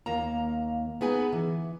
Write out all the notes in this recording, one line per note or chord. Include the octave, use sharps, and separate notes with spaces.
D#2 A#3 A#5
B3 D#4 G#4 B4 G#5
E3